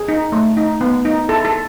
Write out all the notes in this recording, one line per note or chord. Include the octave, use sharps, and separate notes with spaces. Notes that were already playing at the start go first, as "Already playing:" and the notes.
Already playing: G#4
D#4
A3
D#4
B3
D#4
E4 A4
A4